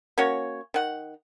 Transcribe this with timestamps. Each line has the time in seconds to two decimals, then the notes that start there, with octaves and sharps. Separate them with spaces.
0.18 A#3 C#4 F#4 C#5
0.74 D#3 F#5